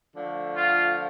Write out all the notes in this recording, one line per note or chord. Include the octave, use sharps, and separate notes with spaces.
D3 F3 A3
F4